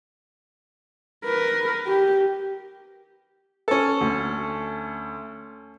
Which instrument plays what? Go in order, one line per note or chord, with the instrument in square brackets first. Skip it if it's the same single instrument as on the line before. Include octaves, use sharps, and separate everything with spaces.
[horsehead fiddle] A#4 B4
G4
[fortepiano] C#4 A4
[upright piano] D2